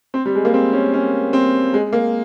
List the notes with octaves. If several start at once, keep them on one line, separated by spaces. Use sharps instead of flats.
C4
G3
G#3
A#3
C4
C#4
C#4
C4
G#3
A#3